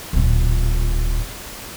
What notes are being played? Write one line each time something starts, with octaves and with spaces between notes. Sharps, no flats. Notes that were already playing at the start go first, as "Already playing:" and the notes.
D1 A#2